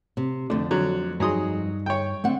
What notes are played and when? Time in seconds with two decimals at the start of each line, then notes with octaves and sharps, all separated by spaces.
0.17 C3
0.50 F2 D3 A3 D4
0.71 D3 F#3
1.20 G2 F#3 D#4 G#4 C6 D#6
1.86 C#5 G5
2.24 D3 A3 C4 F#5